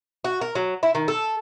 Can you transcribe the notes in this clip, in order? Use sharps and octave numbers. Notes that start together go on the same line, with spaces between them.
F#4
A#4
F#3
E4
D#3
A4